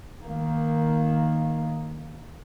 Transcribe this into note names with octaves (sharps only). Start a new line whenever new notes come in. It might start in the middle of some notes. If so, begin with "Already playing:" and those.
D#3 A#3